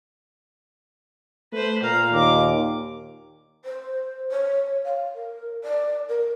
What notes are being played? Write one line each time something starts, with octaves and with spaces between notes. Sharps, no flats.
A3 B4 C5
A#2 F5 A#5
D#2 D6
C5
C#5
F5
A#4
D5
A#4